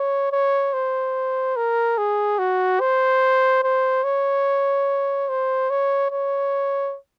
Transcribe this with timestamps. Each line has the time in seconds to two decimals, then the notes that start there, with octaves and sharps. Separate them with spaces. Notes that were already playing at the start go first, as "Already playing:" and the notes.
Already playing: C#5
0.32 C#5
0.74 C5
1.56 A#4
1.98 G#4
2.39 F#4
2.80 C5
3.64 C5
4.04 C#5
5.29 C5
5.70 C#5
6.11 C#5